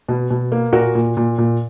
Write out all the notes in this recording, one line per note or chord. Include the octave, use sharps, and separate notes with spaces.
B2
B2
A#3
A#2 F#4 A#4
A#2
A#2
A#2